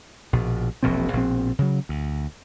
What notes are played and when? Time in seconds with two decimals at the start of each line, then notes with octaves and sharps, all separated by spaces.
0.33 A#1 B2
0.83 E1 A#1 B2 C4
1.13 A#1 B2 C4
1.59 C#3 F#3
1.89 D2